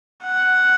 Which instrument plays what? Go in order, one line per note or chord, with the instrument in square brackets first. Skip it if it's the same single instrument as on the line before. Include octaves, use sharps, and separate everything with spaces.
[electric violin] F#5